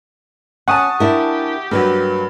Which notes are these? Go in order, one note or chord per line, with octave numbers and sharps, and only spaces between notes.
C#4 F#5 G#5 A5 C#6 D#6
D4 E4 G4 A#4
G2 F#3 A#3 B4